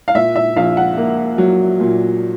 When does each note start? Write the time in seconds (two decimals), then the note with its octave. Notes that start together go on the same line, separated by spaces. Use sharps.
0.08 F5
0.15 A#2 E5
0.36 E5
0.56 A#1 F5
0.77 F#5
0.97 A#3
1.38 F#3
1.80 A#2